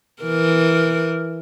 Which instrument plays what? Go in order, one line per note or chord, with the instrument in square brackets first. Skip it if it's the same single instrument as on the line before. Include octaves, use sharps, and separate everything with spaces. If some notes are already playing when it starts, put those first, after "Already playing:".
[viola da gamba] E3 A#4